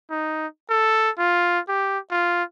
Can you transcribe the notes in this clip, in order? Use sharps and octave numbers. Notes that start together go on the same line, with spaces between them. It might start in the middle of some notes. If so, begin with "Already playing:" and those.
D#4
A4
F4
G4
F4